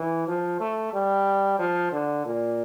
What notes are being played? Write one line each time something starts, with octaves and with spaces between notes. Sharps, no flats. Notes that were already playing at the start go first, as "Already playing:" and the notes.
Already playing: E3
F3
A3
G3
F3
D3
A#2